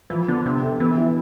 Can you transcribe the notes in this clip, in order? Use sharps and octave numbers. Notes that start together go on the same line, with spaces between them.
E3 F3
D3 B3
C3 D4
A4
E3 B3
E4